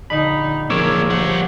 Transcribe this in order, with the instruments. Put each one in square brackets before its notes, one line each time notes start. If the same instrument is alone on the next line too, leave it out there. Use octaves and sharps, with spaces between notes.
[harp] A#1 D3 A#3 [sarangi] D#4 [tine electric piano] B5
[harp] F3 [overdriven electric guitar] A#3 G#4 [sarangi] A#4 [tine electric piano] C#5 D6 E6
[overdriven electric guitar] G3 F#5 [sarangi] C5